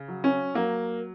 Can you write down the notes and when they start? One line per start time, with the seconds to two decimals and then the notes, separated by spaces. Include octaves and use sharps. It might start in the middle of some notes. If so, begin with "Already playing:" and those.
Already playing: C#3
0.08 F#3
0.24 C#4
0.54 F#3 A#3